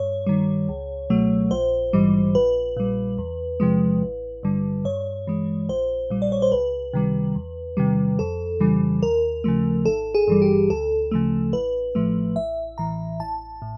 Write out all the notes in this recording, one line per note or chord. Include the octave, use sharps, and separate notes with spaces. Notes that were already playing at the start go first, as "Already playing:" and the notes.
Already playing: G2 C#5
D#3 G3
C#2
B2 F#3 A3
A#1 C5
G#2 E3 G3
A#1 B4
A#2 G3
E2
C3 F3 G#3
A1
G2 D3 G3
G2 C#5
E3 G#3
A#1 C5
A#2 G3
D5
C#5
C5
C#2 B4
C3 D#3 G3
E2
C3 D#3 G3
F2 A4
C#3 E3 G3
D#2 A#4
C#3 F3 A3
G#1 A4
G#4
G2 E3 G3
G4
D2 A4
C#3 F3 A3
A1 B4
A2 F3 A3
A1 E5
A2 E3 A#5
A1 A5
A2